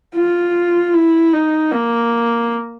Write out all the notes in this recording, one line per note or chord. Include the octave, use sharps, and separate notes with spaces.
F4
E4
D#4
A#3